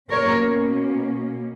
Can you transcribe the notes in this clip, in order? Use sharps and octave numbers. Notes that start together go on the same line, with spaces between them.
B2 A#3 C#4 A#4 C#5